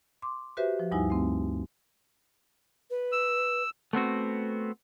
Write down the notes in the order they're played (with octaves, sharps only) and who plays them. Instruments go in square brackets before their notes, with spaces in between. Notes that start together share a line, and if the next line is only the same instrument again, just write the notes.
[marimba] C6 D6
F#4 G4 B4 C5 E5
F3
D2 G2 G3 D#4 E4 G#5
A3 C4
[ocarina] B4
[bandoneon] E6
[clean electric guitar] A3 B3 C4 F#4